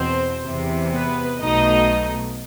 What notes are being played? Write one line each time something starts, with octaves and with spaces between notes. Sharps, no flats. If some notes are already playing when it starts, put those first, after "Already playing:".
Already playing: E2 B2 C4 C5
E2 C3 E3
B3 B4
B1 B2 A3 D#4 D#5